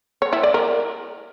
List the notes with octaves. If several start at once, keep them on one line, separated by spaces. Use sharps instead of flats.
C#5
E4
D5
A#4